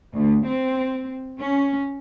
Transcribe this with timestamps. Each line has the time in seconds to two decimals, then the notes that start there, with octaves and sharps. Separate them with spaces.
0.15 D2
0.47 C4
1.39 C#4